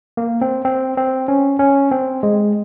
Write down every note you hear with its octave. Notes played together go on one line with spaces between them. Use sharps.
A#3
C4
C4
C4
C#4
C#4
C4
G#3